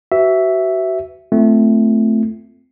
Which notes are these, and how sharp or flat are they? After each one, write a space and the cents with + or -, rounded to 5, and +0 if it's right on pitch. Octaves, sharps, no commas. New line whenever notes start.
F#4 +30 B4 +15 E5 +0
A3 +0 C4 -15 F4 -30